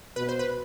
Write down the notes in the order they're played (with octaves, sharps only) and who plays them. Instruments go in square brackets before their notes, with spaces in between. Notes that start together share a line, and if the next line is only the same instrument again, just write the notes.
[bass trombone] B2 [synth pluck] B4
[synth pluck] C5
B4